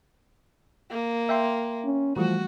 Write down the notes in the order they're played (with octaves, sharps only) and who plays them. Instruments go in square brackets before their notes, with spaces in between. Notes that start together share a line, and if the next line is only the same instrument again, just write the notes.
[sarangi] A#3
[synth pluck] E5 G5 C6
[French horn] C#4
[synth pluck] E3 G3 A3 [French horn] F3 [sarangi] F#4